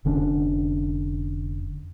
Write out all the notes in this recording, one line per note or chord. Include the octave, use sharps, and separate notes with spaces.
F1 D3 C#4 D4